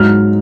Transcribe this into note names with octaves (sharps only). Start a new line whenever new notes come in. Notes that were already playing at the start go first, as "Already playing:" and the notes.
Already playing: G#2 F#3 F6